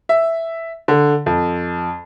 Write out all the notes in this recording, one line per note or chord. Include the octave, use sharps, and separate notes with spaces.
E5
D3
F2